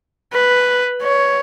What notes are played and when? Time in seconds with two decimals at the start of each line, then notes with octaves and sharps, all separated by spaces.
0.33 B4
1.02 C#5